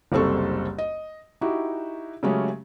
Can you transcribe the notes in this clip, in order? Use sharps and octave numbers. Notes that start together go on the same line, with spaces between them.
F#1 C2 C4 A4 C#6
D#5
D#4 E4 F#4 G4
C#3 F#3 G#3 A3 C#4 G4